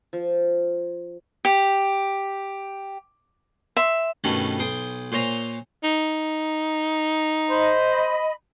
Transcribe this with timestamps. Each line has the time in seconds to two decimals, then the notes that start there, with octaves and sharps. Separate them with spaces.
0.13 F3
1.45 G4
3.77 E5 C6
4.24 G2 B2 D#3 A3 C#4
4.60 B1 G5 C6 D#6
5.12 A#2 C5 C#5 A#5 C6
5.83 D#4
7.50 C5 D#5 B5